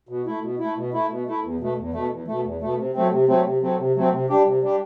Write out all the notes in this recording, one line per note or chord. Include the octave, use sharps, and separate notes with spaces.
B2
A3 E4
B2
E4
A3
B2
A3 E4
B2
A3 E4
E2
B2 A3
E2
B2 A3
E2
B2 A3
E2
B2 A3
C3
F#3 A3 C4
C3
F#3 A3 C4
C3
F#3 A3 C4
C3
F#3 A3 C4
C3
G3 D4 G4
C3
G3 D4 G4